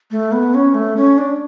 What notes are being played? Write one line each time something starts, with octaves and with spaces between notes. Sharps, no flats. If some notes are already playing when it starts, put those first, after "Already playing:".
A3
B3
C#4
A3
C#4
D4